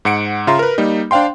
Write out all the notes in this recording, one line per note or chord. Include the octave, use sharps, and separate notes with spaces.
G#2 F#5 C#7 D7
C#3 F4 E5 A#5 C6
A#4 B4
G3 A#3 D#4
D4 C5 F5 G5 C6